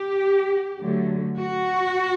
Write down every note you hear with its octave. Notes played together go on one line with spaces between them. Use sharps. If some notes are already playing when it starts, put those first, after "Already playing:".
Already playing: G4
D3 F#3 A3
F#4